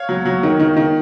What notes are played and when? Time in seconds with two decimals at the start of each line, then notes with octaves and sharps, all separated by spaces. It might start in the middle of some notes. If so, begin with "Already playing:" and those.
Already playing: C#5 F5
0.09 F#3
0.25 F#3
0.43 D#3
0.60 D#3
0.77 D#3